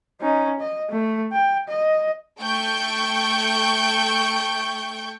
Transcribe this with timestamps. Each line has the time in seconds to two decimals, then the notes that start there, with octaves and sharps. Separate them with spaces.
0.21 C#4 D#4
0.60 D#5
0.90 A3
1.33 G5
1.68 D#5
2.40 A3 G5 C#6 G6 D7